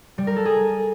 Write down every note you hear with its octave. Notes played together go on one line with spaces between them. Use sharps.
G3
A#4
A4
G#4